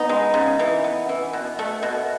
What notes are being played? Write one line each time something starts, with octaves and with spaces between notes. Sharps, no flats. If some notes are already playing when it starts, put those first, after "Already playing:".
Already playing: B3 D#4
G#3
C#3
E3
B3
E3
B2
A3
B2